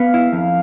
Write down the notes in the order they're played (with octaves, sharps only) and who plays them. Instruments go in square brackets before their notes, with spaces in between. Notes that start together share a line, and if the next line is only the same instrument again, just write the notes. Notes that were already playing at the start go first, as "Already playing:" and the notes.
Already playing: [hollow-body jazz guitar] B3 [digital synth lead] F5
[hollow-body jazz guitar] E4
F2